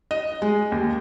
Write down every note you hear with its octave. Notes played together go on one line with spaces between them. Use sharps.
D#5
G#3
D#2